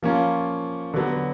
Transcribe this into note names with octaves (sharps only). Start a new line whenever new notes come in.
F3 A#3 C#4 F4
D3 F#3 B3